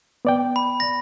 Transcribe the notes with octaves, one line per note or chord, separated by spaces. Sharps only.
B3 D5 G5
B5
A#6